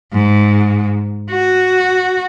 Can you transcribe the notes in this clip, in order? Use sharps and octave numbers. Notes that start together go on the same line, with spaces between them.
G#2
F#4